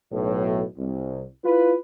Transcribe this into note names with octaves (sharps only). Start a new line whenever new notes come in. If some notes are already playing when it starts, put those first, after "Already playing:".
B1 A2
C2
E4 F4 B4